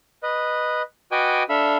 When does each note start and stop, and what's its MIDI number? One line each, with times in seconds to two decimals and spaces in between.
0.23 0.82 71
0.23 0.82 75
1.12 1.43 66
1.12 1.43 71
1.12 1.43 75
1.12 1.43 79
1.12 1.43 80
1.12 1.43 86
1.49 1.77 62
1.49 1.77 69
1.49 1.77 76
1.49 1.77 77
1.49 1.77 83
1.49 1.77 88